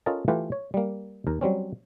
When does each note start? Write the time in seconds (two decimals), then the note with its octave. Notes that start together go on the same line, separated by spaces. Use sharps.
0.06 C#4 F4 A4 A#4 D#5 A5
0.28 E3 A3 F4 G4 B4
0.52 C#5
0.74 G3 A#3
1.27 D#2 A#4
1.41 F#3 G3 C4 C#4